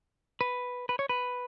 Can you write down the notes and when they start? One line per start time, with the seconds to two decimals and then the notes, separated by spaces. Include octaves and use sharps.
0.41 B4
0.89 B4
0.99 C#5
1.09 B4